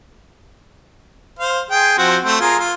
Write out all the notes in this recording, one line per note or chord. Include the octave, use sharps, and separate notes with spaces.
C5 F5
G#4 G5
F3 C4 F#4
A3 C4
F4 G#4 A#4
F4